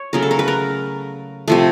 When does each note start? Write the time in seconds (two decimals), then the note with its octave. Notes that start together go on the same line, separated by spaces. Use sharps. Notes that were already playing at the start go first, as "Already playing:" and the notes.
Already playing: C#5
0.13 C#3 F#3 A3 A#4
0.22 A4
0.31 A#4
0.39 B4
0.48 A#4
1.48 C3 F3 A3